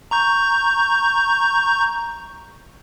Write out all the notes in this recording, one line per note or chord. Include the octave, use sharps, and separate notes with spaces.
A#5 C#6 G6